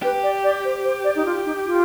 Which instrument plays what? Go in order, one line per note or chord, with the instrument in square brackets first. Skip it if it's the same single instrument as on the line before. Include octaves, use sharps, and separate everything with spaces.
[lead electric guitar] G4 [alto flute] B4
[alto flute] D5
D5
C5
C5
D5
D#4
F4
D#4
F4